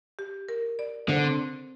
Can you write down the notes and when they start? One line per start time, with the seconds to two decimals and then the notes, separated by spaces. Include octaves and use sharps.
0.19 G4
0.49 A#4
0.79 D5
1.09 D3 C5
1.24 C4